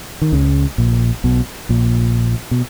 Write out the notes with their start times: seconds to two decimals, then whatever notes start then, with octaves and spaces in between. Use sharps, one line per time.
0.21 D#3
0.32 C#2 C#3
0.78 A#1 A#2
1.24 B1 B2
1.69 A#1 A#2
2.51 B2